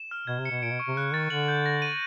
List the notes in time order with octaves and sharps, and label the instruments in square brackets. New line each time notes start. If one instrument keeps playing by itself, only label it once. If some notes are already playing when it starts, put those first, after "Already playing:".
Already playing: [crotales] E7
F6
[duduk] B2 [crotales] G#6
[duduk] C3
[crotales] C#7
[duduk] B2
[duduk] A#2 [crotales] D7
[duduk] B2
[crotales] C#6
[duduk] C3
[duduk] C#3 [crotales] F#6
[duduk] D#3 [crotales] A6
[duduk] D3 [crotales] F#7
[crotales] G6
A#6
D#7